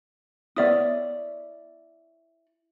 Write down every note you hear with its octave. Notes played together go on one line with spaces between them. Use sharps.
B3 E4 C#5 D5 E5 D#6